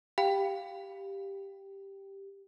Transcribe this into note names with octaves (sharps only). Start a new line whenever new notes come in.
G4 F5 G5 B5